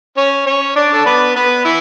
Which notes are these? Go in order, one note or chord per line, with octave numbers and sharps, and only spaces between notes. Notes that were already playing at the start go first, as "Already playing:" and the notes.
C#4 C#5
C#4 C#5
D4 D5
A4
B3 B4
B3 B4
E3 E4